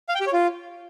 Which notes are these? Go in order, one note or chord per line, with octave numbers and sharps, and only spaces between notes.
F5
G5
G4
C#5
F4